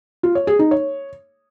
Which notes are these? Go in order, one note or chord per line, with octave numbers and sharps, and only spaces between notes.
F4
C#5
G#4
D#4
C#5